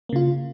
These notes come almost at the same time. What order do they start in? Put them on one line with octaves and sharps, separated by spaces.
A#3 C#3 F4